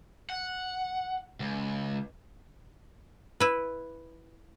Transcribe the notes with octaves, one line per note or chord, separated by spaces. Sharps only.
F#5
C#2
E4 B4